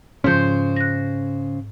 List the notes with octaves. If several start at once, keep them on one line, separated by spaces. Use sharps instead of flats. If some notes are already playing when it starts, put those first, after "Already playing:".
G#2 C#3 F3 C#4 C5 G6
F#6 A#6